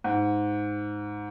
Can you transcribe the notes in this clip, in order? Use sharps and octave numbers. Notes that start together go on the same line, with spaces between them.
G#2